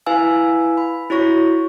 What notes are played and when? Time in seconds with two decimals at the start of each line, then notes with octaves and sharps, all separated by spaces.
0.06 E4 B4 F5 G#5 E6
0.77 B5
1.10 E4 F#4 C#5 C#6 A#6